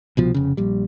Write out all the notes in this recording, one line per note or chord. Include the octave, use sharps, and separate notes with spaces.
C2 B2 F3
F1 C#3
A#1 G3